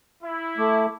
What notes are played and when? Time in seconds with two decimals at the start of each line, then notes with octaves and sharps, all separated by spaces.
0.23 E4
0.58 A3 D6